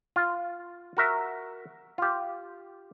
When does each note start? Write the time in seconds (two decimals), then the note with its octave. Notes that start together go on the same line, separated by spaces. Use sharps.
0.16 F4
0.97 F#4 A#4 E5
1.98 F4 G4